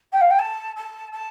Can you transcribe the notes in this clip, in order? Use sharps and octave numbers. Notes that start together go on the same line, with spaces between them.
G5
F5
G5
A5
A5
A5